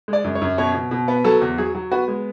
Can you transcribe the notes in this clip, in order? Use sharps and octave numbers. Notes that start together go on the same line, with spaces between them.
G#3 D5
F#2
C#5
F#2
B2 C#5
B2
B2
B3
F#3 A4
E2
F#3 G#4
F#3
B3 F#4
G#3